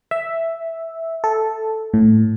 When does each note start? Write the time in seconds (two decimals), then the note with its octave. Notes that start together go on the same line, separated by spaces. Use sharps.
0.11 E5
1.24 A4
1.94 A2